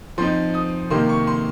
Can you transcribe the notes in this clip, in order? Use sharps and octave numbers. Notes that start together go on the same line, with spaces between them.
F3 C4 D#4 C6
D#6
C3 D#3 A#3 C6
C#6
C6